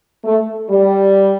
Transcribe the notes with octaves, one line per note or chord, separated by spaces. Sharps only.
A3
G3